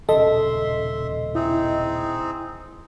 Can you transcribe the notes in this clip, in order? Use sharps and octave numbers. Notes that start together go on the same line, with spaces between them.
D#1 B1 C#3 A4 D#5 E5 C6
C4 D#4 E4 G#4